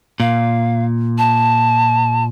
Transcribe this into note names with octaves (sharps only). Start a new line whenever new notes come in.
A#2 F5
A5